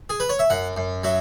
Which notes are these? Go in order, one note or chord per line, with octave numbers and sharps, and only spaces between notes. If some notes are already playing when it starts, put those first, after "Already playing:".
G#4
B4
C#5
E5
F#2 F#5
F#2
F#3 E5